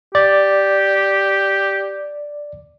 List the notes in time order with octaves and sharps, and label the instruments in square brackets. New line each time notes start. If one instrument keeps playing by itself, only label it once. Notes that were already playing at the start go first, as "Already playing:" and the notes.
[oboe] G4 [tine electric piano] D5